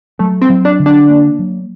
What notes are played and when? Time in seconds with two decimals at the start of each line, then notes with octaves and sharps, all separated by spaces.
0.19 F#3 A3
0.42 C4
0.49 F#3
0.65 D4
0.80 D3
0.86 D4
1.09 A#3
1.39 F#3